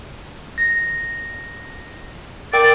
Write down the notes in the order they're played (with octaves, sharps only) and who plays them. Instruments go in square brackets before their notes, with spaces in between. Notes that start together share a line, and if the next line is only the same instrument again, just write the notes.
[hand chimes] A#6
[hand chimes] A#4 G5 [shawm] D5 [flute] A6